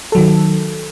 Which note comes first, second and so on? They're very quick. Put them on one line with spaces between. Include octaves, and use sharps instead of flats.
A4 F#3 D#3